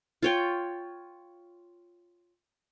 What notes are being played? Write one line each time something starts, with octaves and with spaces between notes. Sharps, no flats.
F4 C#5 G5